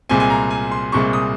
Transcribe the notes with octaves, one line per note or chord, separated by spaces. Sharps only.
C2 A#2 G#3 C4 G#5
G#5
A#5
G#5
C6
C2 A#2 G#3 C4 C#6
D#6